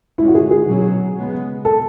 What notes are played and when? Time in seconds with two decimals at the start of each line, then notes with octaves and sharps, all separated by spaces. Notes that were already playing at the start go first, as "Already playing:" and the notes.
0.18 D3 G#3 C#4 E4
0.28 F#4
0.35 G#4
0.51 G#4
0.67 B2 F#3 C#4
1.17 C#3 G#3 B3
1.65 A4